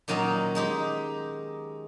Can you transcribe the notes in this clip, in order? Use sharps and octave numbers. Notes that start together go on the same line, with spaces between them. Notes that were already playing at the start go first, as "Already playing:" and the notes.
A#2 D#3 F#3 C#4 D#4
G#3 D#4 G4